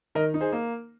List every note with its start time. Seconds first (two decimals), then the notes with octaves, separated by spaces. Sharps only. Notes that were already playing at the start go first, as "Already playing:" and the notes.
0.15 D#3 A#4 D#5
0.34 D#4
0.41 G#4 C5
0.52 A#3